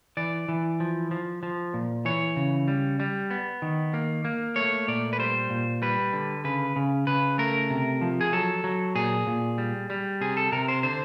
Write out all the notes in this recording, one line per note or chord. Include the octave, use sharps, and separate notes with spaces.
E3 D5
E3
F3
F3
F3
A#2
E3 C#5
C#3
G3
G3
B3
D#3
A#3
A#3
A3 C#5
A#2 D5
B4
G3 C5
A#2
G3 B4
D3
C#3 B4
C#3
C#3 B4
A3 A#4
C3
F3
G#4
F#3 A4
F#3
A#2 G#4
A#2
G3
G3
C3 G#4
A4
C3 A#4
C5
D3 C5